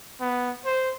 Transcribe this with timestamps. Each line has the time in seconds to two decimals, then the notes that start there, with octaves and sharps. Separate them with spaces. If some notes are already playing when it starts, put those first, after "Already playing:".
0.21 B3
0.65 C5